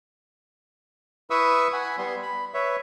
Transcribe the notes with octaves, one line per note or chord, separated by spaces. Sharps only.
E4 B4 E5 C#6 D#6 E6
F#5 G#5 B5
G3 B3 C6
B5
B4 C#5 E5